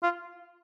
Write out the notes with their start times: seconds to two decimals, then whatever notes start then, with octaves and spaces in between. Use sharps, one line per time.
0.03 F4